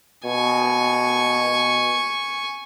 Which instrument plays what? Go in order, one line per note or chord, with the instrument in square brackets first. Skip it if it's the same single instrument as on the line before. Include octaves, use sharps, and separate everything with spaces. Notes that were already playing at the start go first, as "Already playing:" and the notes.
[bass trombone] B2 [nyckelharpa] G#5 C#6